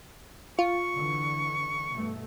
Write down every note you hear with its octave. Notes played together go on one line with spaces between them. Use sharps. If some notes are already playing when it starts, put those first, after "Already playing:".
F4 C#6
D3 E3
G2 B2 A3